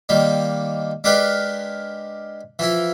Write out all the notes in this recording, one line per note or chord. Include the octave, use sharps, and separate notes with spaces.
D#3 G3 A#3
G#3 D4 G4 A#4 B4 F5
E3 F3 E4